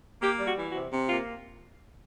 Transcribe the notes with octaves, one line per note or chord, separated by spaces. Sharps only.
A#3 G4
G3
F#4
E3
F#4
C3
C3
A#3 F4